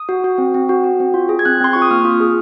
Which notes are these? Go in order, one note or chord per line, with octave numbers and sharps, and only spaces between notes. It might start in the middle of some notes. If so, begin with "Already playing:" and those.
Already playing: D#6
F#4
F#4
C4
C4
F#4
F#4
C4
F4
G#4
G#6
C4 F#6
C4 C6
F4 C#6
D#6
A#3 F6
F4
G#4